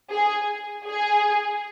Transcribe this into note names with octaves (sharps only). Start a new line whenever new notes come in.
G#4
G#4